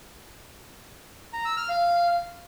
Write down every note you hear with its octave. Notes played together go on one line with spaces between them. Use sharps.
A#5
E6
F6
F5